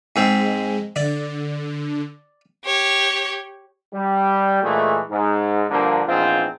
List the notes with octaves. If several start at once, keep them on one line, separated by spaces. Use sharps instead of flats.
G#2 G#3 C4
D3 D5
G4 C#5
G3
A#2 E3 G#3 A3
G#2
G2 D3 F3 A#3
A#1 E2 G#2 C4 F4